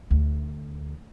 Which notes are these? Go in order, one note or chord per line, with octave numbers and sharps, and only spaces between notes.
D2